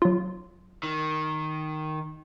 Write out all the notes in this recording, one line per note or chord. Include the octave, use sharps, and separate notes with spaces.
F#3 F4
D#3